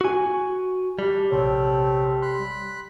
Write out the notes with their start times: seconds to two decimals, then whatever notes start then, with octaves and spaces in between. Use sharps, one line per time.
0.01 F#4 G#5
0.99 G3 D4
1.31 A#1 C3 A3 C4 C#5
2.22 B5 C6 F#6